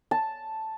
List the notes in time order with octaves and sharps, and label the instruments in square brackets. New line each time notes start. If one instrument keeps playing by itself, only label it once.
[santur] A5